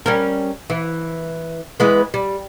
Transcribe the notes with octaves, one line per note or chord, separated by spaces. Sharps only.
G3 C#4 A#4
E3
E3 G#3 B3
G3